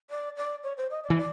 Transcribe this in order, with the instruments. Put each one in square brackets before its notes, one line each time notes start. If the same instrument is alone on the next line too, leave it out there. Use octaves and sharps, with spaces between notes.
[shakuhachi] D5
D5
C#5
C5
D#5
D5
[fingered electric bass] E3
[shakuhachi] D5